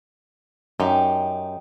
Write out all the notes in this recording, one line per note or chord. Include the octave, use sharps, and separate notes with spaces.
F#2 D#4 G4